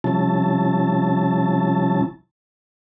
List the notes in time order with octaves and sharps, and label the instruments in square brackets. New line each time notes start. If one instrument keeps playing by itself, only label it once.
[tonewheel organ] C3 F3 G3 C#4 E4 A5